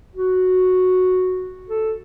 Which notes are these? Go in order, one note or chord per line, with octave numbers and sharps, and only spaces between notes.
F#4
A4